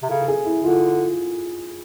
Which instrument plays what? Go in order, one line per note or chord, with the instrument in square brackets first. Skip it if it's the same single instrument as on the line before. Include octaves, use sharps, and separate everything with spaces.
[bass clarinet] C3
[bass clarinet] C#3 [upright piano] A4
[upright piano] A4
G#4
E4
[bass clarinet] D3 [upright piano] F4